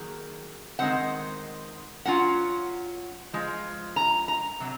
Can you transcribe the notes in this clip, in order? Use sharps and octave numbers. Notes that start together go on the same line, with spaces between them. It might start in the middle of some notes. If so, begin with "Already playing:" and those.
Already playing: D#3 F#3 A#3 G#4
D#3 G#3 C4 F#5
F#3 C#4 F4 F#5
F3 G#3 F4
A#5
A#5
C3 F#3